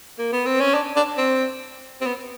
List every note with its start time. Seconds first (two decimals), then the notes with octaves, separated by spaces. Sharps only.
0.19 A#3
0.32 B3
0.46 C4
0.60 C#4
0.74 D4
0.96 D4
1.18 C4
2.01 C4
2.06 B3